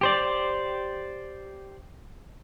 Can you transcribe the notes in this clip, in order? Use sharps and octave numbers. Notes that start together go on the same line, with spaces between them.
G4 C5 D5